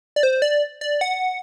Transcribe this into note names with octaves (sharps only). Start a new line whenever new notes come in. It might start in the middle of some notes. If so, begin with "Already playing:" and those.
D5
C5
D5
D5
F#5